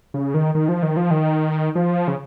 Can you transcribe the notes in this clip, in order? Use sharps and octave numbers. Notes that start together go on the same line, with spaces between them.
C#3
D#3
D#3
F3
D#3
F3
D#3
F3
C#3